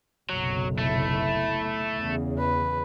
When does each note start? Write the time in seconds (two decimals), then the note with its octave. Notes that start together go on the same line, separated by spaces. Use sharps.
0.29 F#1 B1 C3 F#3
0.78 A3 E4
1.97 E2 C#3
2.39 B4